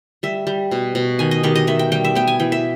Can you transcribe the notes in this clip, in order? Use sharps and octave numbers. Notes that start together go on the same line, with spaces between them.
G3 E5
G3
B2
B2
D#3 G#5
D#5
D#3 G4
D#5
D#3 E5
G5
G3 G5
E5
B3 G5
G#5
E3 G5
E5